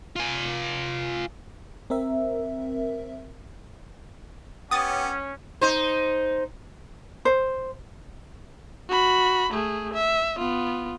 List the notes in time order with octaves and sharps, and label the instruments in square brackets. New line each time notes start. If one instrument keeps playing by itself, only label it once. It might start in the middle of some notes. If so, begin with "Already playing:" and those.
[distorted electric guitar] F4 G#5
[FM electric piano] C4 A#4 E5
[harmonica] B3 G4 [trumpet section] C#4 [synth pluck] D#6 A6
[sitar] D#4 C5
[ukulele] C5
[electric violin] F#4 B5
A3 G#4
E5
B3 F4